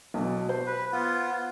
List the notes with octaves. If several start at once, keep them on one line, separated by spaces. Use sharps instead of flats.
B1 B2
C5
B4
B3 F4